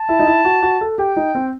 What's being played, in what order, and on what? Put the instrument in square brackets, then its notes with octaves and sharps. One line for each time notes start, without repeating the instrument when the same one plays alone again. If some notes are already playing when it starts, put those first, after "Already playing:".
Already playing: [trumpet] A5
[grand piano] E4
D#4
E4
F#4
F#4
A4
[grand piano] G4 [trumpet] G5
[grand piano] D#4
C4